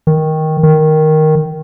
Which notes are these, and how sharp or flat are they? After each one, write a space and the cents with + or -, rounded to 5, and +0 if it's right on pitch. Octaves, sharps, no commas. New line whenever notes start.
D#3 +10
D#3 +0